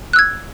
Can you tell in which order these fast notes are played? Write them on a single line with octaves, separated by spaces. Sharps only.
F#6 E6 G#6